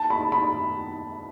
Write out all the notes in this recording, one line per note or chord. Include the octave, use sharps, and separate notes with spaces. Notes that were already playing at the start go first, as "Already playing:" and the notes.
Already playing: A5
B5
B5